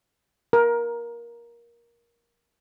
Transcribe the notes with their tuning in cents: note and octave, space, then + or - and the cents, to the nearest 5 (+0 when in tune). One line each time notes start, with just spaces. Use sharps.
A#4 +15